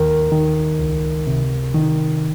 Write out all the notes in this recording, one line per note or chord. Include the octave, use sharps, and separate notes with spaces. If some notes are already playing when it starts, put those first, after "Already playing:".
Already playing: D#2 D#3 A#4
D#3
C#2
C3
D#3